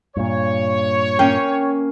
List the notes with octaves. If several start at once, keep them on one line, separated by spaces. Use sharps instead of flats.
G2 A#2 C#5
A#3 C#4 G5